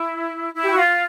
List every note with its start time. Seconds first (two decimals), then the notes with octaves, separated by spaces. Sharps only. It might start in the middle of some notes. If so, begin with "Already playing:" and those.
Already playing: E4
0.54 E4
0.64 G4
0.71 F#4
0.78 F4